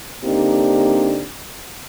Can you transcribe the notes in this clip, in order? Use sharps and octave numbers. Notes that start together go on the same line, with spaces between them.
D3 A#3 C4 D4 D#4 G4